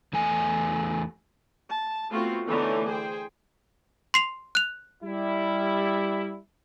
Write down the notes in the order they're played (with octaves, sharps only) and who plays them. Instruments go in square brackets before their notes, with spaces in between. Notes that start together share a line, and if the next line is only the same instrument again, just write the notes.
[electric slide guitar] E2 A3 G#5
[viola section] A5
A3 B3 C4 F4 F#4
D3 E3 A3 B3 D#4 C#5
G#4 C5 G5
[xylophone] C6 C7 F7
F#6 F7
[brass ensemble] G3 E4